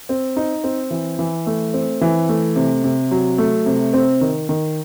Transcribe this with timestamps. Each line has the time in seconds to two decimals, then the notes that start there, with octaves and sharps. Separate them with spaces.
0.09 C4
0.36 D#4
0.64 C4
0.91 E3
1.19 E3
1.46 A3
1.74 C4
2.01 E3
2.29 A3
2.56 C3
2.84 C3
3.11 F#3
3.38 A3
3.66 C3
3.93 C4
4.21 D#3
4.49 D#3